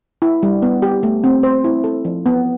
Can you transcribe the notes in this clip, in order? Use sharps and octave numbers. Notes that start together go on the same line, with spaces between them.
E4
G3
B3
G4
A3
C4
C5
E4
A4
F3
B3